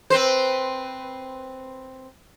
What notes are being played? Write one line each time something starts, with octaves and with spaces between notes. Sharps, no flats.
C4 B4 C5